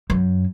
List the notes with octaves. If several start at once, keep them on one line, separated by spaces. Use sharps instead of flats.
F#2